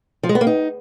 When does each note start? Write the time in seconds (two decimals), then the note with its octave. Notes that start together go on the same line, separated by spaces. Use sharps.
0.23 F3
0.29 G#3
0.35 B3
0.41 A#3
0.47 D#4